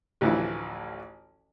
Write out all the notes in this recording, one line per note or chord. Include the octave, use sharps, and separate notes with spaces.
A1 D2 E3 F3 E4